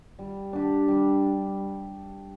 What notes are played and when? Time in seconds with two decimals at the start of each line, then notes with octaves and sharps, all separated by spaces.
0.19 G3
0.53 D4 G4
0.88 G3